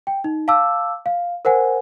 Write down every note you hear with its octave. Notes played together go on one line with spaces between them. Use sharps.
G5
D#4
F5 A5 D6 E6
F5
A#4 C5 F#5 G#5